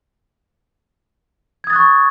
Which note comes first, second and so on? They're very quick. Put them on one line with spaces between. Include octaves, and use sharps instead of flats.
G#6 D#6 A6 F#6 C#6